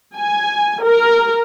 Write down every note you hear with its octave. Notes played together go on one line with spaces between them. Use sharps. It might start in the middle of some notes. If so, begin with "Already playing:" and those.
G#5
A#4